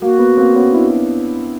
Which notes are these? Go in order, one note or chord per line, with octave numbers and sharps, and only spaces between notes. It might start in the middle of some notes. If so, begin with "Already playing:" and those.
A#3 F#4
B3
A#3 C4
B3 C#4
D4 E4